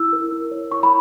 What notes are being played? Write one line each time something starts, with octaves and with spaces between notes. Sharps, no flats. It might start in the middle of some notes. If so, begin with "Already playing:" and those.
Already playing: E4 E6
A#4
E4
C#5
E4 C#6
B5